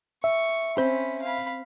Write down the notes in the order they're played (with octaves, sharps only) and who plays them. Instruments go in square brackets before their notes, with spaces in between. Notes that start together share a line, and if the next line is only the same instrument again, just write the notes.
[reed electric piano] E5 [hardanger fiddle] C#6
[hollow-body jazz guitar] C4 C5 [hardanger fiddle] C#4 B5
[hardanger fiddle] F5 B5